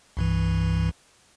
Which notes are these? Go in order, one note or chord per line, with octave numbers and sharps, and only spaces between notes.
C2 G2 E3